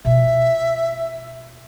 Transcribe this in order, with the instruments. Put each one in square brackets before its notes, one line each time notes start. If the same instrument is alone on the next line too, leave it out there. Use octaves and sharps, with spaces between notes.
[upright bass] B2 F4 [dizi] E5